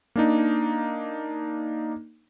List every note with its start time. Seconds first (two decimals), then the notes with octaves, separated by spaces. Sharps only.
0.16 A#3 D4 D#4